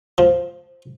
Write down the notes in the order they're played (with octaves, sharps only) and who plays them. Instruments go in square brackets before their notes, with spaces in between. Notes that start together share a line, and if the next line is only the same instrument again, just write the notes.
[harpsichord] F3